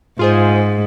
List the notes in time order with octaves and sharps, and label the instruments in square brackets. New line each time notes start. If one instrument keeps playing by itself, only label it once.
[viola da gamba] G#2 [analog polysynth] F4 G#4 C5